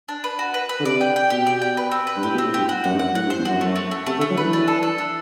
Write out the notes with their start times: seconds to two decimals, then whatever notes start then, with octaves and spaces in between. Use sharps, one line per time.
0.09 D4
0.24 B4
0.39 F#4
0.54 B4
0.69 B4
0.79 D3
0.85 C3 D5
1.01 G5
1.16 G5
1.30 B2 G4
1.47 D5
1.62 G5
1.77 B4
1.92 C4
2.07 B4
2.16 G2
2.23 A2 G4
2.34 B2
2.38 C4
2.45 A2
2.54 G2 G4
2.69 F#4
2.84 F#2 F#5
2.94 G2
2.99 F#2 F#5
3.15 A2 F#5
3.26 G2
3.30 C5
3.38 E2
3.45 F#2 F#4
3.61 F#2 A3
3.76 A3
3.91 A3
4.06 C3 A3
4.18 D3
4.21 A3
4.30 F#3
4.37 D3 E3 B4
4.53 D4
4.68 A4
4.83 A4
4.98 D4